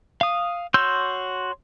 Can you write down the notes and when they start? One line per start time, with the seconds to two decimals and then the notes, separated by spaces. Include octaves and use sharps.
0.21 F5 D#6
0.74 F#4 C#5 C6 E6 G6